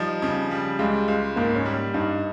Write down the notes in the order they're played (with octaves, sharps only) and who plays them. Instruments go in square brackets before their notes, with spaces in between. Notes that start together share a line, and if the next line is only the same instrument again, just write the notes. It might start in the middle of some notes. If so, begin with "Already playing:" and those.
Already playing: [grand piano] F3 D#4 [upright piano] G3
[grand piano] C#3
G3
[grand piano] C#2 [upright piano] G#3
[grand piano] C#2
[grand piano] G#2 [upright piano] A#3
[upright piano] C#4
[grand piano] G3
[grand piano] G2 [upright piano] D#4